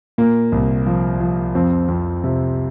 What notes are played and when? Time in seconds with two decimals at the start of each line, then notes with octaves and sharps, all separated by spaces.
0.18 A#2 A#3
0.52 C2
0.86 F3
1.20 F3
1.55 F2 C4
1.88 F2
2.24 C3